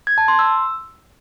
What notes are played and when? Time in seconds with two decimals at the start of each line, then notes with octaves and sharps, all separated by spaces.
0.07 G#6
0.18 A5
0.28 C6
0.39 E6